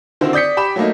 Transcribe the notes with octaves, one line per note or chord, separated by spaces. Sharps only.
D3 D#3 C4 E4 F#4 C5
D5 D#6 G6 B6 C#7
G4 G5 B5 D6 E7
F#3 A3 A#3 D#4